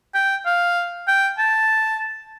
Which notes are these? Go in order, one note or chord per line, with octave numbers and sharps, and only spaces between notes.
G5
F5
G5
A5